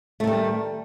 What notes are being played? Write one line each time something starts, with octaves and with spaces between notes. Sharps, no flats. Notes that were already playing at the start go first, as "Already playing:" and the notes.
D#3 G3 A3